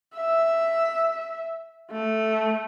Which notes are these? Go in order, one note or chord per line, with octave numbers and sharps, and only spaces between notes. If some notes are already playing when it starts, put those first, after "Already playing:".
E5
A3